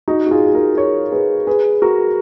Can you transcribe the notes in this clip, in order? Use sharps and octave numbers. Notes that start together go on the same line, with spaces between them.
D#4 F#4
F#4
F4 G#4
G#4
F#4 A#4
A#4 C#5
G#4 B4
G#4 B4
F#4 A#4